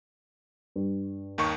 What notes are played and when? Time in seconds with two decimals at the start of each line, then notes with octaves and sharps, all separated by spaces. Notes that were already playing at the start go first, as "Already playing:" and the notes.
0.76 G2
1.38 D#2 D#3 C#6